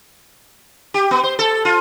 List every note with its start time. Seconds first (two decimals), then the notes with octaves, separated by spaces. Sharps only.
0.94 G4
1.11 B3
1.23 C5
1.39 A4
1.65 F4